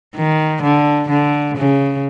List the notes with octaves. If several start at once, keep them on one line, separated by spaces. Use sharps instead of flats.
D#3
D3
D3
C#3